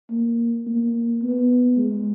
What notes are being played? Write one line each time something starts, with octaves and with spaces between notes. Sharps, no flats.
A#3
A#3
B3
G#3